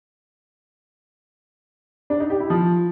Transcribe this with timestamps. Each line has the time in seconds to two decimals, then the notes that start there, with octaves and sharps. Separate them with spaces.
2.10 D4
2.20 D#4
2.30 G4
2.40 E4
2.50 F3